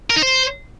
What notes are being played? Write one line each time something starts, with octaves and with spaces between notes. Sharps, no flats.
A#4
D#4
C5